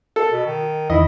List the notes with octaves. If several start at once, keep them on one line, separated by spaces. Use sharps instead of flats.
A4
B2
D#3
E2 D#3 E4 D#5